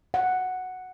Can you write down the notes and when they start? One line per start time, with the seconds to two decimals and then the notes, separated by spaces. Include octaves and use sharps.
0.14 F#5